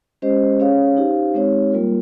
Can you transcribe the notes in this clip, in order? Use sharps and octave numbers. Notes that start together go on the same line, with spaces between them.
G#3 C#4 G4 C5 D#5
C#4 G#4 C#5 F5
D#4 G4 C5 F5
G#3 C4 D#4 G4 C#5
G3 A#3 F4 A#4